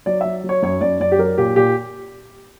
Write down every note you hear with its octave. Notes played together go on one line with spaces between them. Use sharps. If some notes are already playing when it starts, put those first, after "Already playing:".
F#3 D5
F#3 E5
F#3
C#5
F#2 C#5
F#2 D5
F#2 D5
G4
F#3 A#4
A#2 G4
A#2 G4